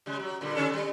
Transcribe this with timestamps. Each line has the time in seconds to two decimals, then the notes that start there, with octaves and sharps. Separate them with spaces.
0.06 C#3 G3 G#3
0.20 F#3
0.41 A#2 D3 G3
0.55 D3 C#4 A4
0.69 B2 G3